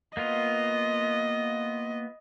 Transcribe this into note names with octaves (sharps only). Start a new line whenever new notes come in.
A#3 B3 F4 D#5